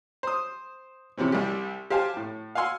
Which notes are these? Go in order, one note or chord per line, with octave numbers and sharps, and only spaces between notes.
C5 D#6
C3 E3 C4 C#4
C2 G3 G4
G4 C5 F5 G#5 A5
A2
F5 F#5 G#5 C6 E6